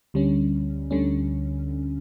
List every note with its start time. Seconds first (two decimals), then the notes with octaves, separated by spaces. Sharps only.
0.14 D2 D3 G3 C#4
0.91 D2 D3 G3 C#4